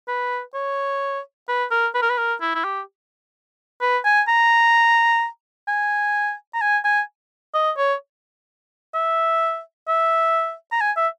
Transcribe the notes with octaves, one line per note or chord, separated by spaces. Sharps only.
B4
C#5
B4
A#4
B4
A#4
B4
A#4
E4
E4
G4
B4
G#5
A#5
G#5
A#5
G#5
G#5
D#5
C#5
E5
E5
A#5
G#5
E5